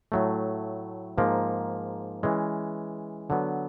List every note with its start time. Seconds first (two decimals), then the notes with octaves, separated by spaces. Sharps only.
0.12 A2 F#3 A3
1.18 G#2 F3 A#3
2.23 E3 G#3 C#4
3.30 D3 F#3 B3